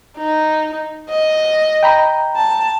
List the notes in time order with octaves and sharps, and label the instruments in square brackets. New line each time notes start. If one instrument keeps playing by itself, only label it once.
[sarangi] D#4
D#5
[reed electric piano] G5 A#5 B5
[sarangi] A5